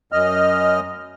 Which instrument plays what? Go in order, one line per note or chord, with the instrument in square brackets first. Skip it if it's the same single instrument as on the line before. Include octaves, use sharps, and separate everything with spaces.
[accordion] F#2 D#5 F6